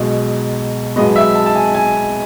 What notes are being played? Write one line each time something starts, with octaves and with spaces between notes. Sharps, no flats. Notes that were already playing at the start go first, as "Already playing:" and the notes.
Already playing: B1 B2 G#3
B1 B2 G#3 B3 D#5
E5
A5
A5
G#5
G#5